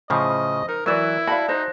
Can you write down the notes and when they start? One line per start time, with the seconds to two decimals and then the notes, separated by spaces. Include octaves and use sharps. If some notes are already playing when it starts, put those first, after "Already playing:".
0.10 A2 C#3 F3 C5 D#5
0.69 D#4 A#4
0.86 E3 F#3 E4 A#4 B4 D5 E6 E7
1.27 F#4 D5 F5 A5 B5
1.48 D#4 C5 F#6 A#6